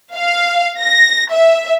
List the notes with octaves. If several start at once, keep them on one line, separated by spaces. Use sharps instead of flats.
F5
A#6
E5